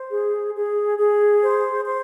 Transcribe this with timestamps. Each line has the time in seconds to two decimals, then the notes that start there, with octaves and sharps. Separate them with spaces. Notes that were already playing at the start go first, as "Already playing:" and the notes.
Already playing: C5
0.11 G#4
0.54 G#4
0.98 G#4
1.43 C5
1.86 C5